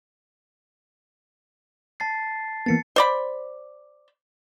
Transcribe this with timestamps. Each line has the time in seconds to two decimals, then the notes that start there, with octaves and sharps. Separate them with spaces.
2.00 A5 A6 C7
2.66 E3 A#3 B3 A6 C#7
2.96 C5 D5 B5